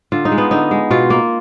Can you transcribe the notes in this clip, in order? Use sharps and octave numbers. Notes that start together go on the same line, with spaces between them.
D3 F4
D#4
G#3
B3
D3 D#4
G#3
B2 F4
A#3